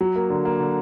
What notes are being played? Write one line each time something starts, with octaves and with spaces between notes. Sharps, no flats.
F#3
A#3
D3
A#3
D3